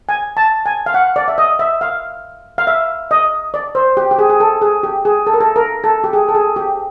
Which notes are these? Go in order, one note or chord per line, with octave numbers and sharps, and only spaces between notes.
G#5
A5
G#5
F5
F#5
D5
E5
D#5
E5
F5
F5
E5
D#5
D5
C5
G4
G4
G#4
G#4
A4
G#4
G4
G#4
A4
A#4
A4
A#4
A4
G4
G#4
A4
G#4
G4